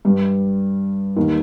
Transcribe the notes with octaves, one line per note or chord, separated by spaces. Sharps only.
G2 G3
D#2 D#3